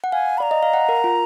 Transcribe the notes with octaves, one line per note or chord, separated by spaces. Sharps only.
F#5
F5 G#5
D5 A#5 B5
D#5
F5
F#5
A#4
F4